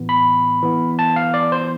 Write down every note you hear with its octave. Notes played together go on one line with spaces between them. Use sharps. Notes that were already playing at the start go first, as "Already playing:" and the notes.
Already playing: A2 E3 B3
B5
E3 B3
A5
F5
D5
C5